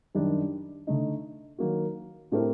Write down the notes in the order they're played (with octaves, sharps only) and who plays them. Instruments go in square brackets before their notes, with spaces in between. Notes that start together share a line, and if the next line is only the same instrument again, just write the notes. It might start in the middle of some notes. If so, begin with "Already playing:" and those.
[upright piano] F#2 D#3 G3 D4
D3 A3 D#4
D#3 F#3 A#3 F#4
A2 A3 C4 G4 A#4